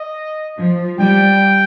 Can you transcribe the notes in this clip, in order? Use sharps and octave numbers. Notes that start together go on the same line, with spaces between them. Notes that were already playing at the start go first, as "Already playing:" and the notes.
Already playing: D#5
F3
G3 G5